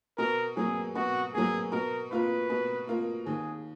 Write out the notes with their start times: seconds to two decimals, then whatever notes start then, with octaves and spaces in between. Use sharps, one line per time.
0.18 B2 A#4
0.56 F#3 A#3 G#4
0.95 B2 F#4
1.34 F#3 A#3 G#4
1.72 B2 A#4
2.10 A#3 F4 A#4 B4
2.50 B2
2.87 A#3 F4 A#4
3.26 D#2 G#4